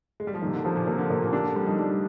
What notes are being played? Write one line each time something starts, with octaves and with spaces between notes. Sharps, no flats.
G#3
G3
F3
D#3 A#3
C3
D3
C3 F3
A#2
C3 A#3
D3
C3 A#3
A#2
D3
C3 D4
D3
F3 G3
D#4
G3 D4